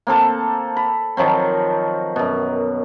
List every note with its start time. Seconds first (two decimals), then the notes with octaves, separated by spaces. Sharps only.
0.07 A#3 C4 A4 A5
0.77 B5
1.17 D#3 F3 F#3 C4
2.16 F#2 B2